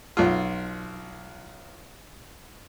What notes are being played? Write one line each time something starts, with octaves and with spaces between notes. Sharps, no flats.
B1 F4